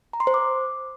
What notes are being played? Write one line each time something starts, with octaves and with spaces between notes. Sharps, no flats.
A#5
C6
C5
D6